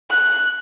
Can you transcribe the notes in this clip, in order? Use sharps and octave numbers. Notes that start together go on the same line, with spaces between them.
F#6